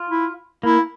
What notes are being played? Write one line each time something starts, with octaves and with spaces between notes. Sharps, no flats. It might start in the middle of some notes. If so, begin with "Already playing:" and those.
Already playing: F4
E4
A#3 E4